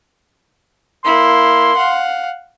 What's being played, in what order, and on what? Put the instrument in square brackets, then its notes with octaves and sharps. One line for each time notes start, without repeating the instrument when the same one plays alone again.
[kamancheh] A#3 E4 [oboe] C6
[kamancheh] F5 F#5